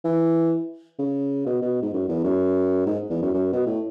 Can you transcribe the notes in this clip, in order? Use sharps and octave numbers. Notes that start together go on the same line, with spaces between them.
E3
C#3
B2
B2
G#2
F#2
E2
F#2
G#2
E2
F#2
F#2
B2
A2